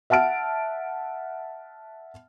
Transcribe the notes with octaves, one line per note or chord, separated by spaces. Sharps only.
E5 F#5 A5 F6 D7